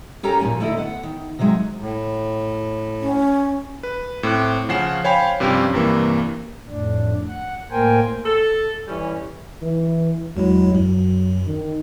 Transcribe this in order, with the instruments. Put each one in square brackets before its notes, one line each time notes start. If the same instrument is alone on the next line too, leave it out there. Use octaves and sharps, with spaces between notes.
[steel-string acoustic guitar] C#4 D#4 G4 A4 A#4 A#5
A#2 F3 A#3 F#4 G#5
D3 A3 E4 A4 D#5
B3 F#5
D#3
C3 D#3 F#3 G#3
[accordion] A2
[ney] C#4
[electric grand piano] B4
A2 C4 D6 F#6
C#3 F3 C#4 F#5 C7 E7
C5 C#5 F5 G5 G#5 B5
G2 C3 F3 C4 C#4 G4
G2 C3 E3 A#3
[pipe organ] F2 A2 D4
F#5
A2 A#3 A#4 C5 G5 G#5
[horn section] A4
E3 G3 C#4
[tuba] E3
[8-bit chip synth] E2 G#3 E4 [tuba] F#3
[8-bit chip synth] F#2 [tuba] F#3
[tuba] D#3